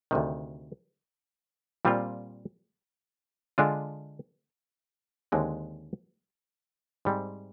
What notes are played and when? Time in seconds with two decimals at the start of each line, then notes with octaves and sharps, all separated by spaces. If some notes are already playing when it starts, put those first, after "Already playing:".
0.11 D2 C3 D#3
1.85 A#2 G3 C4 F4
3.58 D3 G#3 D4 F4
5.32 D#2 D3 G#3 C4
7.05 G#2 G3 C4